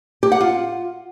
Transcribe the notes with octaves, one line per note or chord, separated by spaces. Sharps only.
G4
F#5
F4